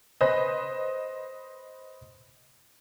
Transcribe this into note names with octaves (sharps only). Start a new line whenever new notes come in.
B4 C5 D#5